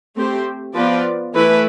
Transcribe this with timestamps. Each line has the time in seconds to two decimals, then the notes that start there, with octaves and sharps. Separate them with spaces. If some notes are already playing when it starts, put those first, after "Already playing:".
0.16 A3 C4 G4 C5
0.74 F3 B3 F4 B4 D5
1.34 E3 A3 E4 B4